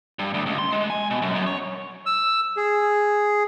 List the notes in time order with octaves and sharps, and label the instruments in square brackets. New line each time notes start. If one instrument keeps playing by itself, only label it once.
[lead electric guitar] G2
D2
C#2
C6
G#3
G#5
B2
F#2
F#2
C#5
[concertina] E6
G#4